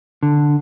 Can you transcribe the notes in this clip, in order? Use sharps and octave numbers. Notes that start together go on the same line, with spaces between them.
D3